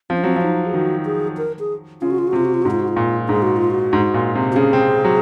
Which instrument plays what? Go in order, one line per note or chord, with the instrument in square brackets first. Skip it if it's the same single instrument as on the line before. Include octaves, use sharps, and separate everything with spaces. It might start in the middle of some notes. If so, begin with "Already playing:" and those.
[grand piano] F3 [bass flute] C4
[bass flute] C#4
[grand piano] F#3 [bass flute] C4
[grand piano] F3
[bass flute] D#4
G#4
[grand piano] D#3 [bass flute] F#4
[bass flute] G#4
A#4
G#4
[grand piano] C#3 [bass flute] F4
[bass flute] F#4
F4
F#4
[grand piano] C3 [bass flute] F4
[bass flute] F#4
F4
[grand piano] G#2 [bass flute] F#4
[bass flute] F4
F#4
F4
[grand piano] A#2
[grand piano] G#2 [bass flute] G#4
[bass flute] F#4
F4
F#4
[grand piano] G#2
A#2
C3
[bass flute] F#4
[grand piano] C#3 [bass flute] G#4
[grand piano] C4
F#3